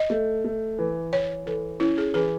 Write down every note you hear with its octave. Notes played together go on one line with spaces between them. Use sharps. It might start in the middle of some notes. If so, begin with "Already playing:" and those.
Already playing: D#5
A3
A3
E3
E3 C#5
E3 A4
C#4 E4
G#4
E3 G#4